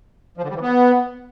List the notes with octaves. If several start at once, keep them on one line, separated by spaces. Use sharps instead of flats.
F3
D3
G3
E3
B3